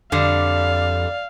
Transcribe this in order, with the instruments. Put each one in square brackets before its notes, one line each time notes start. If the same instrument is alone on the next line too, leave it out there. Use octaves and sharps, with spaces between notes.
[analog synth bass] F2 [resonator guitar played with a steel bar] D3 G3 [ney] D5 [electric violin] F5